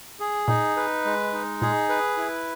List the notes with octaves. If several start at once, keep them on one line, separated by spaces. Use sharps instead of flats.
G#4
A#2 D#4
B4
G#3
D#4
A#2 G#4
B4
E4